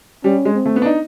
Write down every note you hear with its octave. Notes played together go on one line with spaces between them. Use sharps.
G3 C#4
G#3
C4
A3
B3
D4
D#4